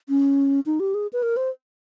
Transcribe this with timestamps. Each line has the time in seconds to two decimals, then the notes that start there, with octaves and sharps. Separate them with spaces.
0.09 C#4
0.66 D#4
0.80 G4
0.94 G#4
1.13 B4
1.23 A#4
1.37 C5